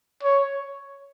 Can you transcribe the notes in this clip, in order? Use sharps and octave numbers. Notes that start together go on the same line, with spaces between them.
C#5